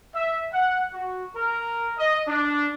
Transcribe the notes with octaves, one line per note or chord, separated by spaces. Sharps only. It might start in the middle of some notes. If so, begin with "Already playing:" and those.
E5
F#5
F#4
A#4
D#5
D4